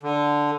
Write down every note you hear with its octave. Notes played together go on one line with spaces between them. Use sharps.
D3